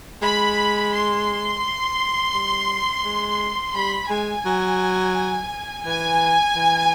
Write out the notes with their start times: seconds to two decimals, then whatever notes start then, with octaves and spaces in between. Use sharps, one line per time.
0.22 G#3 B5
0.93 C6
2.34 G3
3.05 G#3
3.74 G3 B5
4.09 G#3 G#5
4.45 F#3
5.85 E3 G#5
6.56 E3